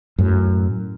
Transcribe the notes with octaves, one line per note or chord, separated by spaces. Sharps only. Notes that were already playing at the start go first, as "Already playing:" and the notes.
F#2 A2